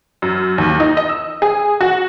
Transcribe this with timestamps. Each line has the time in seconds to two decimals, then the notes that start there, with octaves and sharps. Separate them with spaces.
0.22 F#2
0.58 D#2
0.80 D#4
0.97 D#5
1.09 E6
1.42 G#4
1.81 F#4